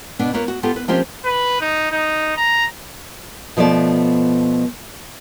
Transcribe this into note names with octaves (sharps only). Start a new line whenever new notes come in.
B2 B3 D4
A#3 F4 B4 C#5
F#4
B3 F4 G4 A4
B4
F3 A#3 C4 C#4 F4 G4
B4
D#4
D#4
A#5
B2 F3 A3 B3 D5